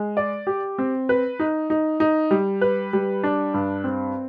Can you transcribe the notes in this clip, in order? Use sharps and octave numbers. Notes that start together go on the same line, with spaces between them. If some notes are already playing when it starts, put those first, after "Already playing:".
Already playing: G#3
D5
G4
C4
B4
D#4
D#4
D#4
G3
B4
G3
D4
G2
C4